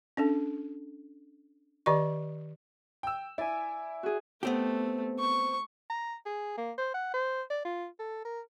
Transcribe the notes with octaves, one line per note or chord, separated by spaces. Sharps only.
C#4 D4 A4
D#3 G4 D5 D#5 C#6
G5 E6
E4 D5 G#5
F#4 G#4
A3 B3 C4 G4
C#6
A#5
G#4
A#3
C5
F#5
C5
D5
F4
A4
A#4